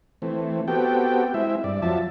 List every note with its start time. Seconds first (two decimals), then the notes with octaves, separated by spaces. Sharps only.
0.22 E3 A3 C4
0.68 B3 C4 F#4 G4 A4 G5
1.34 G#3 C4 E4 E5
1.64 G2 D5
1.82 F2 F3 F#3 E5 A5